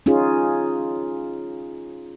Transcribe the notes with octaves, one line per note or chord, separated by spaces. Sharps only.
C#4 D#4 F4 G#4